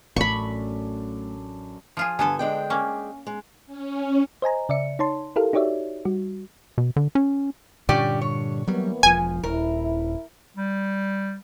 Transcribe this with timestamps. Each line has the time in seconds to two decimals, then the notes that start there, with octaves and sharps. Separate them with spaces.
0.16 A1 F#2 A3 D4 A4 B5 C#6
1.97 F3 F4 G#4
2.19 G2 D3 B3 A4 G#5
2.39 G#3 D4 G5
2.70 A#3 C#4
3.27 G#3
3.66 C#4
4.42 C5 D#5 G#5 A#5
4.69 C#3 D5 E5 C#7
4.99 D#4 C#5 A5 C6
5.36 E4 G4 A4 A#4 F5
5.53 D#4 F#4 G4 C#5 D5 E5
6.05 G3 F#4
6.78 B2
6.96 D3
7.15 C#4
7.89 G2 A#2 D3 C#4 G4 D5
8.21 C#5
8.67 E3 F#3 G3 A#3 B3
9.03 E1 F3 G#5
9.43 D#1 E4 A#4
10.57 G3